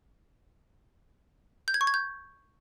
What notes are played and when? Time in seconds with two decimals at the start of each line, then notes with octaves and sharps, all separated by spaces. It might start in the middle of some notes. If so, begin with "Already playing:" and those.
1.68 G6
1.74 G#6
1.81 C#6
1.87 G#6
1.94 G6